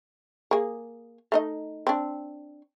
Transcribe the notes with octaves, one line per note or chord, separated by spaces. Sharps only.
A#3 G#4
A3 D#4 D#5
C4 D4